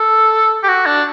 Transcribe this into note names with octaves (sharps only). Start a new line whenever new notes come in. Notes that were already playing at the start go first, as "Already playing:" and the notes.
Already playing: A4
G4
F#4
D4